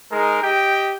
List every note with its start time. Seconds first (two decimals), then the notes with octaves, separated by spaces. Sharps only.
0.11 G#3 D#4 A#4
0.42 G4 D#5 G5